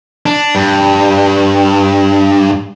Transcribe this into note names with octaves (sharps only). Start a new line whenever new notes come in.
D4
G2